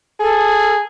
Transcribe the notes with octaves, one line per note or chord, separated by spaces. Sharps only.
G#4 A4